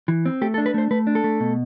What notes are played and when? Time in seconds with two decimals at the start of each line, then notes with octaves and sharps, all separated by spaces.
0.08 E3
0.26 C4
0.42 A3 G4
0.54 A4
0.58 D4
0.66 B4
0.74 A3 C5
0.91 A3 B4
1.07 D4
1.15 A4
1.24 A3
1.40 B2